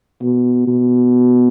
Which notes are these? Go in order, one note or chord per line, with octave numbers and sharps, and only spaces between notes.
B2
B2